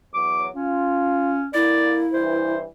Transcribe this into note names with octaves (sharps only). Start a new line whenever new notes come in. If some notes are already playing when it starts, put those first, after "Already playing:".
E2 F#3 D6
C#4 F4
D3 A#3 E4 D5
G2 E3 C5